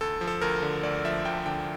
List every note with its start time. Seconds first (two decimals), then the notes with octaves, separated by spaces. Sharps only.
0.01 D2 A4
0.21 F3
0.28 A4
0.41 D2 A#4
0.63 D3
0.83 D2 D5
1.05 F3 E5
1.25 D2 G5
1.46 D3 G5